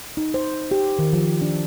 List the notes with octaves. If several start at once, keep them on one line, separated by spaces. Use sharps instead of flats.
D#4
C5
G4
D#3
F3
D4